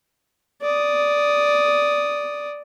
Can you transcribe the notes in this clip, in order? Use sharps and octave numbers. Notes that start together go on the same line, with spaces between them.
D5 D#6